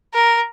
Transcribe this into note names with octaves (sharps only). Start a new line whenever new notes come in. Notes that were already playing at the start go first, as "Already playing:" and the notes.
A#4